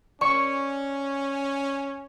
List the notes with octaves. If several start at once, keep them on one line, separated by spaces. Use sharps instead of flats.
C#4 D5 C#6